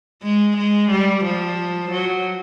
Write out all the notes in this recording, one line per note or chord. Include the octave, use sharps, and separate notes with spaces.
G#3
G#3
G3
F3
F#3